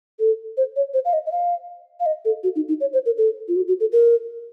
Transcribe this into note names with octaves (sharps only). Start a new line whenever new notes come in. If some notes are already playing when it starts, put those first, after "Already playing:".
A4
C5
C#5
C5
F5
D#5
D#5
F5
F5
D#5
A4
F#4
D#4
D#4
C#5
C5
A#4
A4
F4
F#4
F#4
A4
A#4